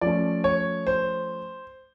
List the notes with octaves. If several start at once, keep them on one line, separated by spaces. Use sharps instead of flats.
F3 A3 C#4 D5
C#5
C5